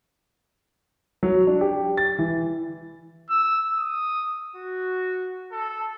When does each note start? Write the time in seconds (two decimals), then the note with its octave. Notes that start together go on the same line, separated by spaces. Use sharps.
1.23 F#3
1.47 D4
1.61 G4
1.97 A6
2.19 E3
3.30 E6
3.78 D#6
4.56 F#4
5.52 A4